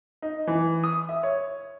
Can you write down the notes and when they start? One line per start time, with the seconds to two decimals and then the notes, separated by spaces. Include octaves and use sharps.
0.22 D#4
0.47 E3
0.84 D#6
1.09 E5
1.23 C#5